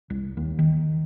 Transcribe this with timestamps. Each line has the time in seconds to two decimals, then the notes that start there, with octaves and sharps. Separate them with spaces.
0.10 C2
0.37 D#2
0.59 D#3